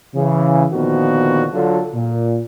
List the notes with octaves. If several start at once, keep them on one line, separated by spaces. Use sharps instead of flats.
C#3 E3
A#2 D3 D#3 F3 B3 F#4
D3 F#3 F4 A4
A#2